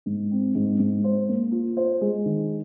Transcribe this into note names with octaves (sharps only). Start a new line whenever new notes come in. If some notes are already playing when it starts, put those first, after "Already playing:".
G#2
C4
G#2
G#2
C5
A#3
F4
C5
G#3
D#3